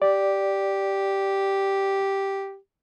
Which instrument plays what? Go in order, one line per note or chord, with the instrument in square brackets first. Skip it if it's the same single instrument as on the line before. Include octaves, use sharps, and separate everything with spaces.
[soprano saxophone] G4 [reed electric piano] D5